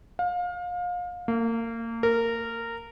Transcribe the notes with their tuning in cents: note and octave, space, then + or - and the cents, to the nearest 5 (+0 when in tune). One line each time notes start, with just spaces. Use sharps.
F5 +30
A#3 -30
A#4 -15